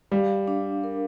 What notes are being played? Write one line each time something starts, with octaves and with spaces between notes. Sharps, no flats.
G3 F5
D4
A#4